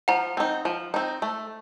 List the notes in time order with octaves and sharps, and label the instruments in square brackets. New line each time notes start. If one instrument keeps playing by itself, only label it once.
[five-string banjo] F3 [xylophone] F#5 A#5
[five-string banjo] C4 D#4
F3
C4 D#4
A3